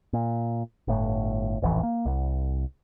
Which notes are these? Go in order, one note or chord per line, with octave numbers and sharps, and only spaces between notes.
A#2
G1 A2
D#1 A1 F2 E3
A#3
C2